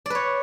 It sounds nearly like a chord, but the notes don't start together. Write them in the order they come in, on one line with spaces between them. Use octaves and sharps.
D5 B4 C#5